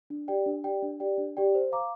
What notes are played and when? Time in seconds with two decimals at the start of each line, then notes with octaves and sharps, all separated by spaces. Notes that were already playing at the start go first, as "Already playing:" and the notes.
0.10 D4
0.28 G4 D5 G5
0.46 D4
0.64 G4 D5 G5
0.82 D4
1.00 G4 D5 G5
1.18 D4
1.37 G4 D5 G5
1.55 C5
1.72 F5 A#5 D6